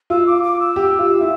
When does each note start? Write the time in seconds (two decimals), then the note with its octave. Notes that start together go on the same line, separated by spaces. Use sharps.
0.10 F4 E6
0.27 D6
0.44 D6
0.60 E6
0.76 G4
0.99 F4
1.21 E4